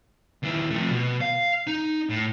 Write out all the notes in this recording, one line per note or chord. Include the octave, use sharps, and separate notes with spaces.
D#2 E4
F3 A3
B2
F5
D#4
A2